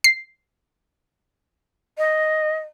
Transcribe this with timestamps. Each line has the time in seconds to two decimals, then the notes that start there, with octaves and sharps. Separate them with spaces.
0.04 C7
1.98 D#5